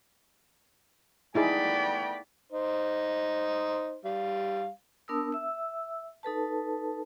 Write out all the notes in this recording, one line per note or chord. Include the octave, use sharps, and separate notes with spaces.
A3 B3 D#4 E4 G#4 D5 G5 B5
D#4 C5
G3 F5
B3 D4 A#4 A5 D#6 E6
E5 E6
D#4 A4 B4 A5